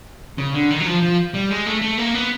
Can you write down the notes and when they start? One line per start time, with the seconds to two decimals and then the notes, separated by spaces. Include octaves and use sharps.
0.38 C#3
0.54 D3
0.71 D#3
0.80 F#3
0.86 F3
1.02 F3
1.34 G3
1.50 G#3
1.67 A3
1.81 A3
1.98 A#3
2.14 B3